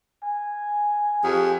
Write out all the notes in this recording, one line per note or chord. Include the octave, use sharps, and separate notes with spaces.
G#5
F2 G4 G#4